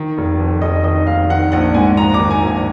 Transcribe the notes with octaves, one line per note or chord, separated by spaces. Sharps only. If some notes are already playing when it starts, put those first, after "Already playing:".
Already playing: D#3
F1
F2
F1 D#5
D#3 D#5
F1 F5
D#3 F#5
A#1 F#5
G#2 G#5
A#1 A#5
D6
D#3
G#5
A#1
G#5